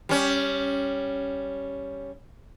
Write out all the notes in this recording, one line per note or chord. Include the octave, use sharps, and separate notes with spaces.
G3 C#4